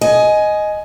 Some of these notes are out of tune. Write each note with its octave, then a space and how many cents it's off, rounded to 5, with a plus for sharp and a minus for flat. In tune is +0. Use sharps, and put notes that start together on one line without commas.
D#5 +0 G#5 +15